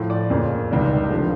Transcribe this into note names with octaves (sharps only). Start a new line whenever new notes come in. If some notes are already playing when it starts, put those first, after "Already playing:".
Already playing: A2 F3 A3
D5
F2 C#3 F3 A#3
C#2 C3 D#3 G3
D3 F3 A3